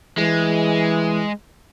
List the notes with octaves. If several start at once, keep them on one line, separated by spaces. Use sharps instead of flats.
E3 G#3